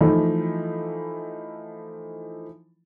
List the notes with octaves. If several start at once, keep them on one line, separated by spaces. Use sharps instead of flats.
E3 F3 A3 D#4 E4